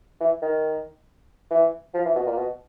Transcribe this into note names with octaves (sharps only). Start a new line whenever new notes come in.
E3
D#3
E3
F3
E3
B2
A#2
B2